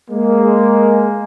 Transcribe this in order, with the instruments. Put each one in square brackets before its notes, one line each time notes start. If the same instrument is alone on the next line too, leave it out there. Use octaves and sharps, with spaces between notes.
[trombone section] G#3 A#3